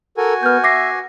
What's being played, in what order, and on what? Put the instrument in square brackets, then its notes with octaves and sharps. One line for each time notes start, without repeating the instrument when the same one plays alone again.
[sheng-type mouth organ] F#4 G#5 [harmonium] A4 A#4
[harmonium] B3 [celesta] F6 G6
[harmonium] E5 [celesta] D6 A#6 C7